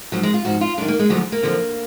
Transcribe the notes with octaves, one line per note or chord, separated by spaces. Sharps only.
G#2 F3 F#3
G#3
F4
G#2 F3 F#4
F4
F#2 D#3 D4
A#3
G#3
D2 D3 F3 F#3
A#3
F#2 D3 F3